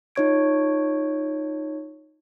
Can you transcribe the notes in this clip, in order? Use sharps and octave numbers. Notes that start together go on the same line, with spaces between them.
D#4 F4 C#5 C#6 G#6 D7